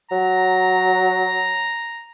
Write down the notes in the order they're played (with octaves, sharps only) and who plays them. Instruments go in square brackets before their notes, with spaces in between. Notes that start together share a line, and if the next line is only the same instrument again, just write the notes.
[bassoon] F#3 [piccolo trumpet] A#5